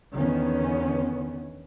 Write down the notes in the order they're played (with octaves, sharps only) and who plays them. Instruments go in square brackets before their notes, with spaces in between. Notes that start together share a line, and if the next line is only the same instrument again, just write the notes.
[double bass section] E2 D3 D#3 B3 C#4